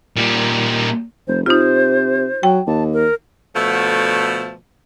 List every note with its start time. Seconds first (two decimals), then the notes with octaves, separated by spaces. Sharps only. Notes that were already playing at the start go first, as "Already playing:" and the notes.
0.17 A#2 G3
1.27 F1 C5
1.46 C3 D#4 F4 C5
2.43 F#3 G5
2.67 D#2 A5
2.93 A#4
3.56 B2 D3 F3 A3